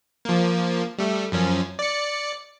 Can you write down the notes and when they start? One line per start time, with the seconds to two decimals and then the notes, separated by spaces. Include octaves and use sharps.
0.25 F3 A#3
0.98 G3 A3
1.32 F#2 F3 C#4
1.79 D5 C#7